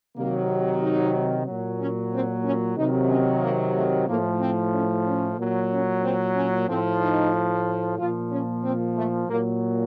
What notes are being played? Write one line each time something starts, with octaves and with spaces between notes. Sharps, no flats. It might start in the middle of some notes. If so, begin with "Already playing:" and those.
C3 D#3 F#3 A#3
D#4
A#2 F#3
C#4
C4
C#4
C3 D#3 F#3 D#4
C#4
A#3
A3
A2 F3 A#3
C4
C#4
C#4
A#2 F#3
C#4
C4
C#4
A2 F3 C4
D#4
A#2 F3 F4
C#4
C4
A3
A#2 F#3 A#3